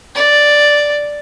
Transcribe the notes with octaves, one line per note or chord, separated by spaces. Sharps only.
D5